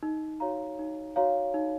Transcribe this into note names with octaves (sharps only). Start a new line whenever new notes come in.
D#4
F#4 C#5 F5 A#5
D#4
F#4 C#5 F5 A#5
D#4